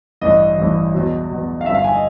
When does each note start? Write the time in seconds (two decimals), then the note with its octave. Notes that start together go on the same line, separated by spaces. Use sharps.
0.21 A1 G2 E3 D#5
0.58 A1 G2 E3
0.94 E2 B2 F#3
1.29 E2 B2 F#3
1.61 F5
1.65 G1 G2 D3 F3 E5
1.74 F5
1.84 G#5
1.94 D#5